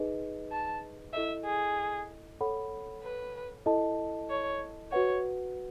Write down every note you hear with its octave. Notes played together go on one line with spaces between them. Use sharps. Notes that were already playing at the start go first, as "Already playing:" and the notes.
Already playing: D#4 G#4 B4 D#5
A5
E4 A4 D#5 E5
G#4
A4 C#5 F#5 B5
B4
E4 A4 D#5 A5
C#5
F#4 B4 C#5 F#5